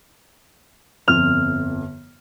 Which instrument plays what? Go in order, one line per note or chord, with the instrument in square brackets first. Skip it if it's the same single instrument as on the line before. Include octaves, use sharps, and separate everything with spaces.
[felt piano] G1 F2 [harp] F6